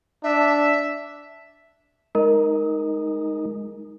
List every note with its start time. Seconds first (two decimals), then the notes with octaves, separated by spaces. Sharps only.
0.24 D4 E5
2.15 G#3 D#4 A#4